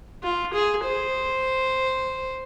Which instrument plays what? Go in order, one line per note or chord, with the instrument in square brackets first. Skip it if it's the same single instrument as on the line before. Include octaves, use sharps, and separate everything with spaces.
[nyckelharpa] F4
G#4
C5